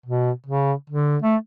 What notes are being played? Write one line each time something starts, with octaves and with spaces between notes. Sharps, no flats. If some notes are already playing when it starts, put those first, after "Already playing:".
B2
C#3
D3
A3